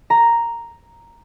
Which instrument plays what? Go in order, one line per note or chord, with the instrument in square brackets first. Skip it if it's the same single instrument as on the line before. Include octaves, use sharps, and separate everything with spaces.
[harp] A#5